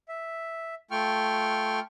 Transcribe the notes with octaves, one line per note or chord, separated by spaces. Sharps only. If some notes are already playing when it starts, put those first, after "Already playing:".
E5
A3 F4 G5 C#6 F6